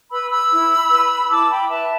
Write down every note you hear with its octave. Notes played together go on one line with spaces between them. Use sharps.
B4 B5 E6
B5 E6
E4
B4
E4 A5 D6
G5 B5
B4 E5 A5